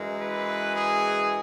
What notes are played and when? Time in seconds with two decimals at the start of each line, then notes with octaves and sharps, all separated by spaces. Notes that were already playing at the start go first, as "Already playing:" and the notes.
Already playing: F#2 E3 G#3
0.18 B4
0.73 G#4